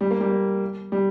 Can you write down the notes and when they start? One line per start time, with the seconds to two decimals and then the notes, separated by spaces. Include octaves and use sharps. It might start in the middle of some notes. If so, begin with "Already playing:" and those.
0.01 G3
0.11 A#3
0.20 G3
0.30 A#3
0.92 G3